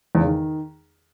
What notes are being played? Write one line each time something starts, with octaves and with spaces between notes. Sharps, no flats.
E2
C#3
D#3